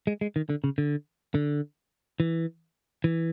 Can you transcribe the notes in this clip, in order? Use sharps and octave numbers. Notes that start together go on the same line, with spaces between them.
G#3
G#3
D#3
D3
C#3
D3
D3
E3
E3